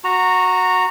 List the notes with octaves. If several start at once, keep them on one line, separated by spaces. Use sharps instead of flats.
F#4 A#5